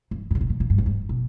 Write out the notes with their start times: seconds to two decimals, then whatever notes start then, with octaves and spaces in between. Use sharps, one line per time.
0.11 G2
0.31 A#2
0.35 C#3
0.41 B2
0.50 A#2
0.60 A#2
0.70 G2
0.78 G#2
0.86 G2
1.09 B2